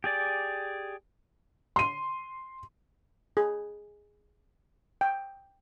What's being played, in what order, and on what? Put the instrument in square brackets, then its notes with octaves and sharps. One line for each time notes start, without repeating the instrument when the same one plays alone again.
[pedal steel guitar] G4 G#4 D5
[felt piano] C6 D#7
[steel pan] G#4
G5